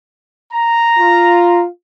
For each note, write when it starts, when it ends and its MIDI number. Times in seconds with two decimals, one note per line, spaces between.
0.53 1.62 82
0.98 1.67 65